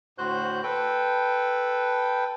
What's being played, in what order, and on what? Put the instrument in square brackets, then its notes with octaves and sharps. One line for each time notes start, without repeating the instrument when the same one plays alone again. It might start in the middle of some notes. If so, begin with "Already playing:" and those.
[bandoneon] D2 A2 F#4 C5 F#6 G6
A4 B4 G5